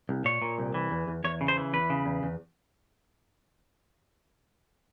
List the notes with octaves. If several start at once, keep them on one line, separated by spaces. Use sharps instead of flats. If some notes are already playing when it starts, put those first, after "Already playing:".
C2
A#2 C#5
A#2
C2
E3
E2
E2
E2 C#5
C#3
C5
E3
E2 B4
C#3
E2
E2